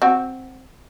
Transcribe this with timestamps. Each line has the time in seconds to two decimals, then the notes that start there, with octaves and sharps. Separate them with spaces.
0.02 C4 F#4